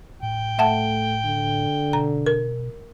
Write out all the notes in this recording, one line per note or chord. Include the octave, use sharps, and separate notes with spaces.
A2 G5
A3 E5 F#5 A5
D3
B2 A#5
A#4